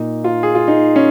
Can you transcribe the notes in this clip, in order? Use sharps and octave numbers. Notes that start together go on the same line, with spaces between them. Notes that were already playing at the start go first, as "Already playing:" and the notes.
Already playing: A#2 A#3 D#4
F4
G#4
F4
D#4
C#4